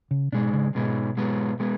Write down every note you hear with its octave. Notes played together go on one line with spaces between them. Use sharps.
C#3
G#2 B2 G#3 D4
C#3
G#2 B2 G#3 B3
G#2 G#3 B3
G#3 B3